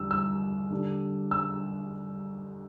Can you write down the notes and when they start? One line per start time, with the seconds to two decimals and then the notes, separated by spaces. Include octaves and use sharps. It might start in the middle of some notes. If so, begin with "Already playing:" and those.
Already playing: E2 D3 G3 E6
0.11 E6
0.70 D3 G3 D4
1.31 E6